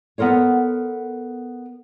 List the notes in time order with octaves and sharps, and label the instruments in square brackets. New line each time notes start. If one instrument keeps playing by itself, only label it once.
[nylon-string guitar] B3 A4 A#4 C5 C#5